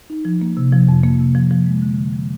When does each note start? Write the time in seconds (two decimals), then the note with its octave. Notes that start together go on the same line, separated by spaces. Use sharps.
0.10 D#4
0.25 F3
0.42 A#3
0.57 C3
0.72 F3
0.89 F2
1.03 A#3
1.20 C3
1.35 F3
1.51 F3
1.67 G#3
1.82 D3
1.98 D3
2.13 F3